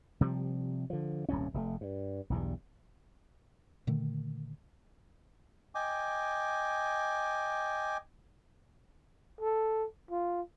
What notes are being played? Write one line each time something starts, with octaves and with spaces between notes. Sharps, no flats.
C3 F3 G3
D3 F3
D#1 C2 G2 C#4
F1 B2 A3
G2
B1 E2 G2
A#2 D3 D#3 A3
D#5 G5 G#5 D6
A4
F4